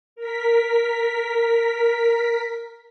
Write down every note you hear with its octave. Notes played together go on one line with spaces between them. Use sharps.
A#4 B6